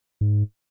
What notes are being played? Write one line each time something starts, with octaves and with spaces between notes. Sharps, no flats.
G#2